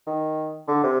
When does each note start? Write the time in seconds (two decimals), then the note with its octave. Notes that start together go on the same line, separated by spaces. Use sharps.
0.07 D#3
0.68 D3
0.84 C3